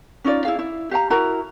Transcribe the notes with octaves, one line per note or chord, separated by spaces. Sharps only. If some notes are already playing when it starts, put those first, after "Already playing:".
C#4 D#4 F4 D5
E4 G#4 F5
E4
G4 F5 G5 A#5
E4 F#4 A#4 A#5